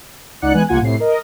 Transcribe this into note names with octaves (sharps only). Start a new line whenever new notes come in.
C#2 D#4 D5 F#5 F#6 C#7
E3 G#3 B3 G#5 F#6
C2 A#3 F4 F#5 G#5 G#6
A2 C3 C7
A#4 D#5